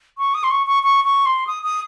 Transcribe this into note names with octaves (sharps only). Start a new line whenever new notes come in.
C#6
D#6
C6
C#6
C#6
C#6
C#6
C6
D#6
D#6